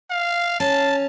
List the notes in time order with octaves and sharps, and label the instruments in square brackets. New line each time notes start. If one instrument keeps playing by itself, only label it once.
[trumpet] F5
[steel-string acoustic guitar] C#4 [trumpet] A5